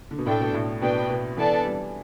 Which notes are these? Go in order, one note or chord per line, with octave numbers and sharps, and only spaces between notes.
D3
B2
A2 A3 D4 A4 G5
B2
A2
B2 D4 B4 G5
B2
E3 B3 D4 A4 D5 A5
G3